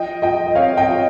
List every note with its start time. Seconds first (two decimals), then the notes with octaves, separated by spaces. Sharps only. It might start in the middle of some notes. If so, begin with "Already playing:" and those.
Already playing: F3 D#5 G5
0.22 F3 D#5 G5
0.46 D#5
0.55 C4 C#5 F5
0.77 D#5 G5
0.89 F3